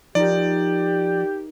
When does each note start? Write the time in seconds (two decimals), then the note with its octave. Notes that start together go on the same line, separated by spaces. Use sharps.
0.15 F3 D#4 G4 A#4 D5